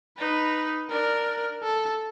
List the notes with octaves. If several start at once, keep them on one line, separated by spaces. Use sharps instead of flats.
D#4 B4
D4 A#4
A4